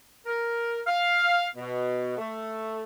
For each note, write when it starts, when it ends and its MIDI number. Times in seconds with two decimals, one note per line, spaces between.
0.26 0.79 70
0.87 1.46 77
1.56 2.16 47
2.17 2.83 57